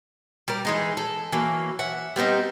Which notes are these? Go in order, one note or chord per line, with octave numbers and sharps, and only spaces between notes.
G3 A#4
E3 G#3 D#4
A4
E3 F#3 A#3
E5 F#5
G3 B3 C4 D#4